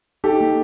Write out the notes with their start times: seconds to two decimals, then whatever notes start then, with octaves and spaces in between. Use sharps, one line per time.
0.24 D#4 G4 A4
0.41 A#3